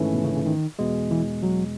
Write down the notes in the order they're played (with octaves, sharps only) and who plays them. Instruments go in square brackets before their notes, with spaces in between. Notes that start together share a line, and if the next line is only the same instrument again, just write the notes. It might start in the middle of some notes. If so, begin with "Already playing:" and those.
Already playing: [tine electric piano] G#1 G#2 E3 A3 C#4
[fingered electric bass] B2
C#3
C#3
D#3
[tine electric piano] E2 B2 G#3
[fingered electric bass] E3
F#3